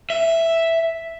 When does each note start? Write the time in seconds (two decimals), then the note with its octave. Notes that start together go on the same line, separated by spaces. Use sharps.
0.10 E5